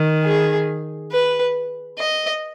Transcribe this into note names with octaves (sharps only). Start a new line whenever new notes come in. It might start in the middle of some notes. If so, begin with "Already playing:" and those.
Already playing: D#3
G#4
B4
D#5